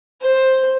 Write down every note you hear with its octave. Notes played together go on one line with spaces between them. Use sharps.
C5